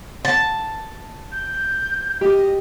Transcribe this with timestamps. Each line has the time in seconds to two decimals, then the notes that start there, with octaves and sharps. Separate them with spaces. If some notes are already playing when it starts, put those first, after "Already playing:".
0.25 A5
1.32 G6
2.21 G4 D#5